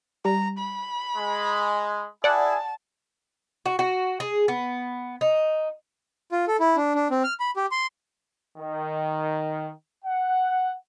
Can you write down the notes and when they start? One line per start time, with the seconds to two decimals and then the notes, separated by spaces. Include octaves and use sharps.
0.25 G3 A#5
0.59 B5
1.16 G#3
2.24 E4 G#4 D5 F#5 G#5 A5
3.66 F#4
3.79 F#4
4.20 G#4
4.48 B3
5.21 D#4
6.32 F4
6.48 A4
6.60 E4
6.76 D4
6.95 D4
7.11 C4
7.24 F6
7.40 B5
7.56 G4
7.71 C6
8.58 D#3
10.04 F#5